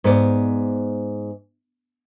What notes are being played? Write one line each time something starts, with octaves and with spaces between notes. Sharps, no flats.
G#2 B3 D5